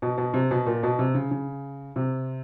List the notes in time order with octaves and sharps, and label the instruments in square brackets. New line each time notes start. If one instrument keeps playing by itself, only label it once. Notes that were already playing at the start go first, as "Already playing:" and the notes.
[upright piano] B2
B2
C3
B2
A#2
B2
C3
C#3
C#3
C3